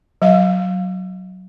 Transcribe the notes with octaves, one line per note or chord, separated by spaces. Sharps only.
F#3 F5